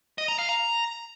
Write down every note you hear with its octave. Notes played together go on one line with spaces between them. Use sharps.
D#5
A#5
F5
A#5